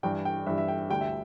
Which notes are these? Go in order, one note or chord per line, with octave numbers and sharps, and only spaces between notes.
G2 E3 G3 G5
G5
G2 E3 G3 E5
E5
G5
D2 D3 G3 G5
E5